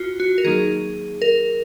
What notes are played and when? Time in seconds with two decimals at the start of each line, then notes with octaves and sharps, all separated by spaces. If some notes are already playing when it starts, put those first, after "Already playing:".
Already playing: F4 F#4
0.20 F#4
0.38 A#4
0.45 D#3 F#3 A#3 D#4 G#4
1.22 A#4